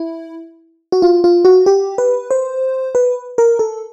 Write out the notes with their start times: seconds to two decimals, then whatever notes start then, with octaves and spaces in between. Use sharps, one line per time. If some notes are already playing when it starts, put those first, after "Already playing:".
Already playing: E4
0.92 F#4
1.02 F4
1.24 F4
1.45 F#4
1.66 G4
1.98 B4
2.31 C5
2.95 B4
3.38 A#4
3.59 A4